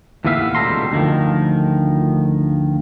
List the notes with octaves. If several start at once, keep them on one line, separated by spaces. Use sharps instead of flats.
D#2 A2 E3 B3 E5 F5
C#2 B2 G3 A4 A#5 C6
D2 D#3 F3